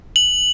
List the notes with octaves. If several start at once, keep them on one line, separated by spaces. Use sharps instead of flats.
F#7